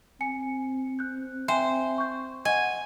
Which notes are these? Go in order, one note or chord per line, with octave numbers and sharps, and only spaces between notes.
C4 G#5 C#7
F#6 G6
C5 E5 G5 G#5
C#6 G6
D#5 F#5 G#5